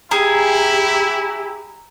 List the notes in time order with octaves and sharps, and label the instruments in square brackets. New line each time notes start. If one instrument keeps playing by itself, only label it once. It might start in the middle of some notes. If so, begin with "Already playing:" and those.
[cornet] E4 [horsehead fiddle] G4 [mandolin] G#4 [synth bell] A#5